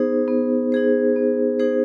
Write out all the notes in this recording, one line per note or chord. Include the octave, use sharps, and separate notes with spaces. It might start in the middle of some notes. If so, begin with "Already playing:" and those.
Already playing: B3 D#4 G#4 C5
B3
D#4 G#4 C5
B3
D#4 G#4 C5